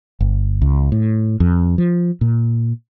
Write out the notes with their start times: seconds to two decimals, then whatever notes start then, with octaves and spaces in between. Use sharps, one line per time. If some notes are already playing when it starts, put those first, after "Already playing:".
0.21 G1
0.62 C#2
0.92 A2
1.40 F2
1.78 F3
2.21 A#2